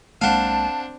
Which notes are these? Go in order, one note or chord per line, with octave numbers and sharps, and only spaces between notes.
B1 G#3 A#3 C4 D4 F5 F#5 A5